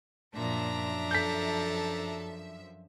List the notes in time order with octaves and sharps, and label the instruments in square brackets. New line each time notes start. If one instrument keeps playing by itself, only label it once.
[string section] F#2 F3 E5 [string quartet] A#2 [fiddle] D4 A#5
[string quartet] A4 [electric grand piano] G6 B6